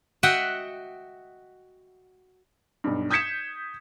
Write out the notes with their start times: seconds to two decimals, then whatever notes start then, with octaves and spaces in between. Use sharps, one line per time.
0.23 F#4 D#5 E5 F#5 G5
2.84 B1 G2
3.10 D#6 G6 G#6 B6 C#7 E7